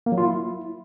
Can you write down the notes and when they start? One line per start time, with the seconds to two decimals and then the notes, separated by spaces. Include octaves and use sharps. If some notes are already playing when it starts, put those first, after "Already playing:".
0.06 A#3
0.12 F#3
0.18 F4
0.23 E4